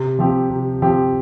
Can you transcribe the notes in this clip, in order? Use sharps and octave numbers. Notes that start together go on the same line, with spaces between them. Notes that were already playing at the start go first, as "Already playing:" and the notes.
Already playing: C3
F3 C4 G4
C3
F3 C4 G4